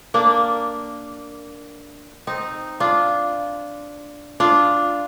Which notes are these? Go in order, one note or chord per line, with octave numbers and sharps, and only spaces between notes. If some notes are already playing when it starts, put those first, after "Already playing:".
A#3 D4
C4 D#4
D4 F4
D4 F4